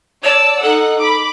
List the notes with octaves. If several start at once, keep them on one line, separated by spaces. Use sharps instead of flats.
C#5 D5 A5 E6
D#4 A4 F#5
B5 D6